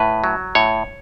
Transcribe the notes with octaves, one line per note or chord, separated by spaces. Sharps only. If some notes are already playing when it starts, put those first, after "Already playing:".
Already playing: A2 B4
F#3
A2 C#5